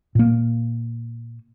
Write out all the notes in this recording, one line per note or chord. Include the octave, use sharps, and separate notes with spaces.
A#2 A#3